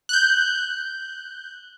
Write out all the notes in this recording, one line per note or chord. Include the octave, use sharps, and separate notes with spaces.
F#6 G6